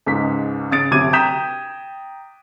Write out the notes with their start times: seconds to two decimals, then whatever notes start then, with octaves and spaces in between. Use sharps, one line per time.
0.06 C#2 G#2 B6
0.71 C#3 D#6 A6 D7
0.91 D2 C3 F#3 D6 G#6 D#7
1.13 G5 A#5 D#6 G6 B6 E7